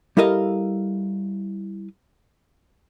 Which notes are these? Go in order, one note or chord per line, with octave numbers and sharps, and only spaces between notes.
G3 E4 A4 A#4 D#5 F5